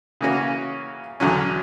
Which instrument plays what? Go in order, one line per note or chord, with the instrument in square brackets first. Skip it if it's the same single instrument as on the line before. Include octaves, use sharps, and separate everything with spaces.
[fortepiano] C#3 E3 A#3 C#4 F#4
E2 D3 F#3 C#4